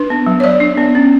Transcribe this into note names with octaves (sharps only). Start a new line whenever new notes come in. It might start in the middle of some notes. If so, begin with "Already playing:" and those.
Already playing: D4 B4
B3
F#3
C#5
F#3 D5
D4
B3
C#4